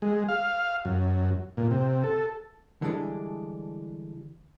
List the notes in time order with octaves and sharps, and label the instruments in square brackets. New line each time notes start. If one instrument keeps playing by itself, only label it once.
[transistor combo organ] G#3
F5
F#2
A#2
C3
A4
[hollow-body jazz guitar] D3 E3 G3 G#3 C4 D4